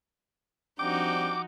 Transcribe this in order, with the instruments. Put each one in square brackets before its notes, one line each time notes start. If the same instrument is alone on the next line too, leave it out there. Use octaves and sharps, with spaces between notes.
[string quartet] F3 D#4 F#4 [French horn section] G3 C4 D4 [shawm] G5 [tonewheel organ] D6